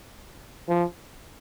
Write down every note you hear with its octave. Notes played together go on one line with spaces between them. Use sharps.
F3